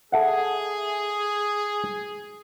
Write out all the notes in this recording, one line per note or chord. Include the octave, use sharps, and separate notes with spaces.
G#4 A4 E5 F#5